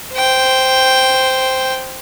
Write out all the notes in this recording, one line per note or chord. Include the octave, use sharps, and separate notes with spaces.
C5 G5